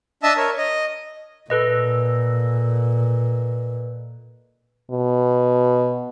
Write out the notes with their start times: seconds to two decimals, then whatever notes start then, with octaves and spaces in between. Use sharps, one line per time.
0.23 D4 D#5 E5 A5 D#6 E6
0.37 A#4 C#5
0.58 D#5
1.50 A#2 A4 B4 D#5
4.91 B2